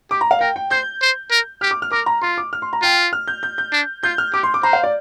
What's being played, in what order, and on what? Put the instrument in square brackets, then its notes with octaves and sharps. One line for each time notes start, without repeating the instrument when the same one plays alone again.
[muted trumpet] G4 [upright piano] D6
[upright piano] A#5
F5
[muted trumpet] A#4 [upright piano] G5
[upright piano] G5
[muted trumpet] C5 [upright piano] G6
[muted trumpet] C5
A#4
[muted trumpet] G4 [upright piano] F6
[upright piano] D6
F6
[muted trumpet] A#4 [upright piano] D6
[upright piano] A#5
[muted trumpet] F4 [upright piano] C6
[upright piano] D6
F6
C6
A#5
[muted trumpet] F4 [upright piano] G5
[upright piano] F6
G6
G6
G6
[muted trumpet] D4
[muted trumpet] F4 [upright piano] G6
[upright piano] F6
[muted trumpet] G4 [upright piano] D6
[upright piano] C6
D6
[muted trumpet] C5 [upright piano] A#5
[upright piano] F5
D5